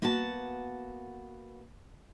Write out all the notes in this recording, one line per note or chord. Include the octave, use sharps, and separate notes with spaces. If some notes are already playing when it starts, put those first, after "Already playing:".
A#3 B3 F#4 F#5 A5